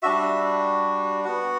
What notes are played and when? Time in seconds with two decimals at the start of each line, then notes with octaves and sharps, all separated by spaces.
0.03 G3 D4 F#4 E5
1.24 B3 F#4 F#5